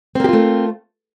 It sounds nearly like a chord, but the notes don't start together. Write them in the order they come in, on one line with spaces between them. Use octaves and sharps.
C4 A#3 G4 F4 A3